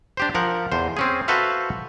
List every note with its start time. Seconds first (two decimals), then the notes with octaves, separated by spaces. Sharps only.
0.17 D4 G4 C5
0.35 F3 A#4 F#5
0.72 E2 C5
0.97 C4 C#4 G#4
1.28 F#4 A4 B4 C5 E5 F5